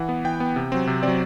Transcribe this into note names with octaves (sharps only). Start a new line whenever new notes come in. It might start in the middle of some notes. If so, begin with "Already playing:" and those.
Already playing: E3 F#5
B3
E3 G5
B3
C3
F#3 C4
C3
F#3 C4 D5